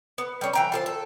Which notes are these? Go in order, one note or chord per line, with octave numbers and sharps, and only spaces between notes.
B3
G3 C#4
E3 G5 A#5
F4 A4 C5
A4